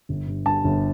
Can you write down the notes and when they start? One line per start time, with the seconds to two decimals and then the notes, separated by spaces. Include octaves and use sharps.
0.09 G1
0.27 G2
0.45 G2 A5
0.64 G1